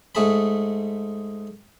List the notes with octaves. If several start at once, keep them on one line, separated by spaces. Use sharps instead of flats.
G#2 A3 G#4 A5 B5